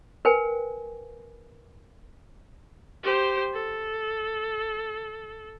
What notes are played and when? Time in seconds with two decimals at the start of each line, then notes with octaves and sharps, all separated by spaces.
0.25 A#4 B4 G5 G#5
3.03 G4 C5
3.54 A4